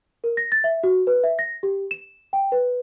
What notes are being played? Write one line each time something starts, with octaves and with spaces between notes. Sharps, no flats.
A#4
A#6
A6
E5
F#4
B4
E5
A#6
G4
E7
G5
B4